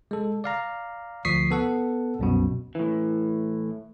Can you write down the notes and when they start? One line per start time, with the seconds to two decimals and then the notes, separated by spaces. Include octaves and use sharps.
0.11 G#3 A4
0.44 D5 F5 A#5
1.25 D2 F3 C#6 D#6 B6 C7
1.51 B3 A4 F#5
2.19 C2 F#2 B2
2.75 A2 E3